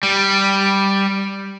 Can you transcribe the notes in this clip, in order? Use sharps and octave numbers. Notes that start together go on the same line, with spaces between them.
G3